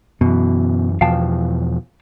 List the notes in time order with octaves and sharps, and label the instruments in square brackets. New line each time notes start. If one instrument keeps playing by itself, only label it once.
[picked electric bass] F#2 E3 [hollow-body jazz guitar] B2
[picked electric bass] E2 B2 F3 [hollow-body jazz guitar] F5 G5 A5